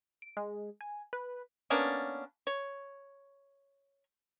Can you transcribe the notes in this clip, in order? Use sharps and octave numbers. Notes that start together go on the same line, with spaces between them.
D7
G#3
G#5
B4
A#3 B3 C#4 D4
C#5